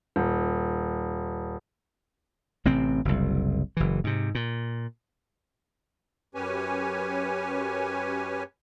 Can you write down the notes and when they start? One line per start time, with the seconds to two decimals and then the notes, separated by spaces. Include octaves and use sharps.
0.16 D#1
2.65 A1 C3 C4
3.05 F#1 C2
3.77 F#1 E3
4.04 G#2 C3
4.35 A#2
6.35 F#2 C#4 G4 B4 C#5 G#5